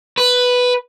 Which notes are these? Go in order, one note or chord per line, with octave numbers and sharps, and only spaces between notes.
B4